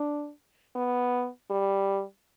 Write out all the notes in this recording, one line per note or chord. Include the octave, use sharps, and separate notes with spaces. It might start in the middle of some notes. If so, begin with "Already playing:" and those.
Already playing: D4
B3
G3